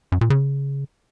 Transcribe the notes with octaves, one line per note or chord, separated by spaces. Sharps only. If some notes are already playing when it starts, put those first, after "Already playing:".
F#2
A#2
C#3